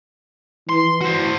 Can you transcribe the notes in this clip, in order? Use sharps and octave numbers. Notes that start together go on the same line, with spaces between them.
E3 C6
F#4 C5